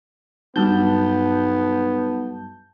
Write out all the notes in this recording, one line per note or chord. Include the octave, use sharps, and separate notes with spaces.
B1 G2 B3 A5 G6